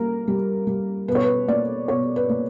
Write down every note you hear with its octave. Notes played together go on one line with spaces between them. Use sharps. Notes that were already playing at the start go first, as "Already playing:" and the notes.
Already playing: G3 A#3 A#4
G3
G3
B2 B4
C#5
B4
A#3 D5
B2 C#5
B4
A#3